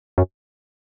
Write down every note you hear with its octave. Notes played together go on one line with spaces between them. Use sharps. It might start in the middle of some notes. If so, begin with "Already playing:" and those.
F#2